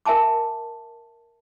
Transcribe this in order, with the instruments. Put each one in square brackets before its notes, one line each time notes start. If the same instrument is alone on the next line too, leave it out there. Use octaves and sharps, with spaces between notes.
[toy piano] A#4 E5 G#5 A5 D6